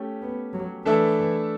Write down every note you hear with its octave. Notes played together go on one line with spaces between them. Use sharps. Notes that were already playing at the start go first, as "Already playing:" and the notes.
Already playing: A3 C#4 G4
B3
F#3
E3 A3 D4 A4 E5